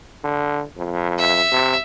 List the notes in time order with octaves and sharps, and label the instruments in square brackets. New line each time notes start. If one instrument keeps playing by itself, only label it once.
[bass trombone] D3
F2
[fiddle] E5
[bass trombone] C3